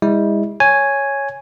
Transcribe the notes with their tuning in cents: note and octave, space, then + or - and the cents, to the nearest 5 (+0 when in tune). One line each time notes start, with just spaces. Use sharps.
G#3 -40 E4 -30
C#5 +0 G#5 +0